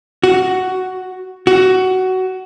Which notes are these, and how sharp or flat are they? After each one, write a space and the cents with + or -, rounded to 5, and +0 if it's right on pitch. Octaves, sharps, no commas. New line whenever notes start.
F#4 +5
F#4 +15